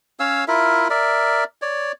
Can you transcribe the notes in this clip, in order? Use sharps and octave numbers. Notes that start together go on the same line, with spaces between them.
C#4 C#5 F5 E6
E4 F4 A#4 E5
A#4 D5 E5
C#5 D5